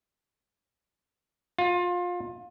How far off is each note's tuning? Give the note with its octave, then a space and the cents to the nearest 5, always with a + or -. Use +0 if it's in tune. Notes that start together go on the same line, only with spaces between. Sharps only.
F4 +25